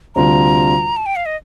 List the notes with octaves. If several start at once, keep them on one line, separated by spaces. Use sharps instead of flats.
D2 C3 G3 D4 F4 A#5
A5
G5
F5
D#5